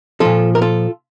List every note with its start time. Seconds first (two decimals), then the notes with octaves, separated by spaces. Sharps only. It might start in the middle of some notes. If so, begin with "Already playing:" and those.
0.20 A#2 F3 F4 A4
0.55 A#4
0.62 F4 A4